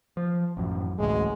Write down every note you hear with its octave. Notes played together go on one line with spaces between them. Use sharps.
F3
A1 F#2
A1 D2 G#3